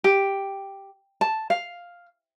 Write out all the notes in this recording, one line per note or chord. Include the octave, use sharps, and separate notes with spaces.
G4
A5
F5